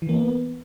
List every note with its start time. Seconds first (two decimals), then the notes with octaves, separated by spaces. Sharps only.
0.02 E3
0.09 A#3
0.16 B3